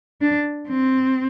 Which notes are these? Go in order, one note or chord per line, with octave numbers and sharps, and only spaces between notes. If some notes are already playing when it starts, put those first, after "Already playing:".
D4
C4